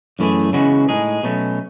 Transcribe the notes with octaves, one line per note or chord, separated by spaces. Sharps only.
F#2 E3 A3 E4 G#4
C#3 E3 G#3 B3 F#4
A2 G#3 D#4 G#4
B2 F#3 A3 C#4